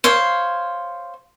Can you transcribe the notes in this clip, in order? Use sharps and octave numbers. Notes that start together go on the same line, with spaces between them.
C5 C#5 F5